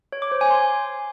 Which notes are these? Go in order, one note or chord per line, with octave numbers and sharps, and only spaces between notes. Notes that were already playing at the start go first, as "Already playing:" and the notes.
C#5
D6
C5
G#5
C6